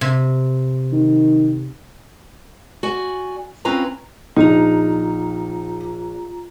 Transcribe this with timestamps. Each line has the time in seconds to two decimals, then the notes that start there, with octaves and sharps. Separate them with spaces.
0.01 C3
0.92 D#3
2.83 F#4 D5 G#5
3.65 C4 C#4 F4 B4 A#5
4.36 A#1 D4 D#4 F4 A#5 F7